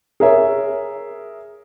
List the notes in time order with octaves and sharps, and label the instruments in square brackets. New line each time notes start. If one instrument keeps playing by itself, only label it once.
[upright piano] G#4 A#4 C#5 E5